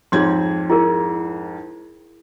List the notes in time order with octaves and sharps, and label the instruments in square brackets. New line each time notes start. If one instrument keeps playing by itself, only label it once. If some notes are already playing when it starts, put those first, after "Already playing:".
[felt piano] F2 G#2 G#6 [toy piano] G#4 C#5 C6
[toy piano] E4 G#4 A#4